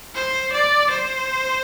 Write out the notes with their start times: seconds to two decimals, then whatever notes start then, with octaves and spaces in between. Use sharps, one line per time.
0.15 C5
0.52 D5
0.90 C5